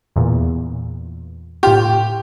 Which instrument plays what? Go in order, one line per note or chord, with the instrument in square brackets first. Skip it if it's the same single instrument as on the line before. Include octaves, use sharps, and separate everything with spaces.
[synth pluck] E2 A#2
[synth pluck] A2 F4 [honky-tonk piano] G4